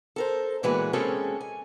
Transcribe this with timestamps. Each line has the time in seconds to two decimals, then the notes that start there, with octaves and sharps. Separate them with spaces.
0.16 A4 A#4 C5
0.63 A#2 E3 G#3 B3 F#4 B4
0.93 G#3 A#3 C4 C#4 G#4 A4
1.40 G#5